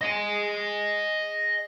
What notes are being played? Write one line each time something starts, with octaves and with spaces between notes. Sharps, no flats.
D#5 G#5